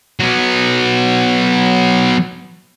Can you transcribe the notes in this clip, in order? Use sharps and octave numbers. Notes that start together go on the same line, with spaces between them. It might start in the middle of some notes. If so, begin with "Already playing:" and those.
F#3 B3